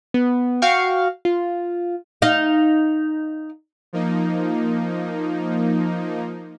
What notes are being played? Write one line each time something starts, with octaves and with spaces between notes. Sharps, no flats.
B3
F#4 F5 G5 C#6
F4
D#4 F5
F3 A#3 D#4